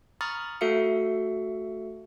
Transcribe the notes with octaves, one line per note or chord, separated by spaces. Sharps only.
A#5 B5 C#6 D#6 F6 A6
A3 F#4 A4 E5 F5 C#7